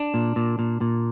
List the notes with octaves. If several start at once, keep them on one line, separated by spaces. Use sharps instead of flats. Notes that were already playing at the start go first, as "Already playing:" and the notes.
Already playing: D4
A#2
A#2
A#2
A#2